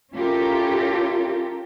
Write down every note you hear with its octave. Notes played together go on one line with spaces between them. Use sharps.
C#4 E4 F4 G4 A4 A#4